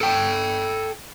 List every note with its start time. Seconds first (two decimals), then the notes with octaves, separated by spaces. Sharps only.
0.01 A4 G5